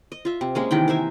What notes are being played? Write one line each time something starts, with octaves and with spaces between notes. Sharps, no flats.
D#5
F4 E5
C3
G#3 A#3 C#4
C3 D#3 E3 G5
A#4 C5 E5 G#5